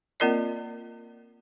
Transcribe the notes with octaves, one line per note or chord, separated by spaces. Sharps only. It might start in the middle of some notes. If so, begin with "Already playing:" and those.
A#3 C4 F4 A#4 D5 D#5